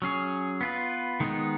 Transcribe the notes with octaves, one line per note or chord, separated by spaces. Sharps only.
F#3 C#4 G#4 C#5
B3 F4 B4
D#3 G#3 B3 D#4